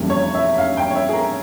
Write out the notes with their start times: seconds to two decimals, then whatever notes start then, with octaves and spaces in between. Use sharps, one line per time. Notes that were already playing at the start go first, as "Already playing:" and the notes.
Already playing: F1 E2 C#3 G3 A#3
0.10 C#5
0.34 E5
0.58 F5
0.77 G5
0.90 C#5
0.95 E5
1.09 G#4
1.13 A#4